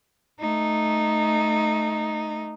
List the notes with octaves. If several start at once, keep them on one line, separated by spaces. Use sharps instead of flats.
A3 D#4